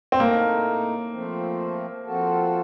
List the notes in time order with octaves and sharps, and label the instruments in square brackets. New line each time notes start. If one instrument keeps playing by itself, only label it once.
[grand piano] C4
[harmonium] A2 A3 D#4 A4 [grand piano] A#3
[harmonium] F3 A3 C4
F3 C4 F#4 A4